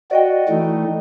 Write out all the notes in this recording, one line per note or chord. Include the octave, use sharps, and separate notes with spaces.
F#4 D5 D#5 G5
E3 A3 D#4